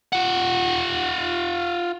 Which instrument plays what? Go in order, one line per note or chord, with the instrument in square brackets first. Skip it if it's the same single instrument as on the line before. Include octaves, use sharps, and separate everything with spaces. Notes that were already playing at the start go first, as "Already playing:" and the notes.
[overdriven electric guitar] F4 F#5